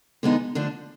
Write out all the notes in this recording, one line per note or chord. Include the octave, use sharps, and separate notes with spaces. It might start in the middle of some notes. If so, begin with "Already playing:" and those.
D3 F3 G#3 B3 D#4
D3 F3 A3 D4